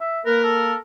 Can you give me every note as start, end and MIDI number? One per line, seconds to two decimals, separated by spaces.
0.01 0.21 76
0.26 0.74 58
0.26 0.74 70
0.26 0.41 71
0.44 0.76 69